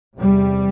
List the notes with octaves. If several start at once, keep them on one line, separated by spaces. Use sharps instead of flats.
E2 C3 G3